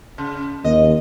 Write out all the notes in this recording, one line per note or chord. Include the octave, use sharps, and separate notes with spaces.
C#3
D#2 D#5